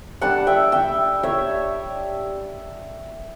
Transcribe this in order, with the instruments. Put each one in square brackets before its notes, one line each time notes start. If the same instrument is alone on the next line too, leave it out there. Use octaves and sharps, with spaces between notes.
[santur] G3 D4 F#5 A5
E5 G5
E5 G5
C#5 E5